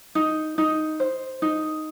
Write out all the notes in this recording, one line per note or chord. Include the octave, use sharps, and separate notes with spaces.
D#4
D#4
C5
D#4